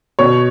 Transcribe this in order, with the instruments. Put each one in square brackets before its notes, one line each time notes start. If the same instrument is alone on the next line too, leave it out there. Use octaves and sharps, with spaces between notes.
[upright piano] B2 C#5